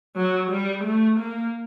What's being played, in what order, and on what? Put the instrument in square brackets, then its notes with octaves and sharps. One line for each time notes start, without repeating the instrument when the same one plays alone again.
[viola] F#3
G3
A3
A#3